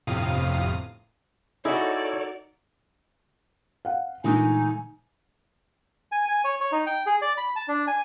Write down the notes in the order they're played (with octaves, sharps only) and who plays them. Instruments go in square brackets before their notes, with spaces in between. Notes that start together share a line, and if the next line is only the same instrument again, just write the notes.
[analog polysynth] G1 F2 A2 C3 F5 D#6
[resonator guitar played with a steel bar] D#4 F#4 [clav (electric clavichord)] E4 G#4 E5 [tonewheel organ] A4 C#5 [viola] D5
[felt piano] F5 F#5
[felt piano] A#2 D3 [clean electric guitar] E3 G#3 A3 [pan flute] D#4 [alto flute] G#5
[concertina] G#5
G#5
C#5
C#5
D#4
G5
G#4
D5
B5
A5
D4
G#5